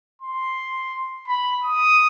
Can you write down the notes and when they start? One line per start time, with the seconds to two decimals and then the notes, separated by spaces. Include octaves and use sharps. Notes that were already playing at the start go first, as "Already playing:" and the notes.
0.22 C6
1.27 B5
1.63 D#6